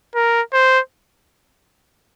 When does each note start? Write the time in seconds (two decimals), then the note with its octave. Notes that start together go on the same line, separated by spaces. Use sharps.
0.15 A#4
0.53 C5